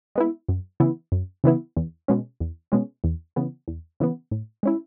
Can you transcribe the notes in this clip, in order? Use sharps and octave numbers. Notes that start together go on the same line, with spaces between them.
G#3 B3 E4
F#2
C#3 E3 B3 E4
F#2
C#3 E3 B3 E4
E2
B2 G#3 C#4
E2
B2 G#3 C#4
E2
C#3 E3 B3
E2
C#3 E3 B3
A2
G#3 C#4 E4